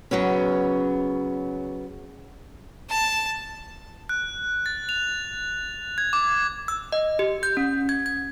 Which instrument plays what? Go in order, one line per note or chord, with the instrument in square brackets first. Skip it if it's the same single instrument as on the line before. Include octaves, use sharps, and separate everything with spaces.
[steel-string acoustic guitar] C#3 F#3 B3 C#4
[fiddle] A5
[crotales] F#6
A6
F7
G#6
D6
[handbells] E6
D#5
G4
G6
C#4
G#6
G#6